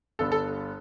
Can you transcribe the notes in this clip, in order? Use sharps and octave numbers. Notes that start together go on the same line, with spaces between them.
G1 G2 D3 B3 A4
A4